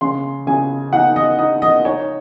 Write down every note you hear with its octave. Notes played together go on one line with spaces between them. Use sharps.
C#3 C6
C#3 G#5
D#4 F#5
D#5
D#4 D#5
D#5
D#4 C#5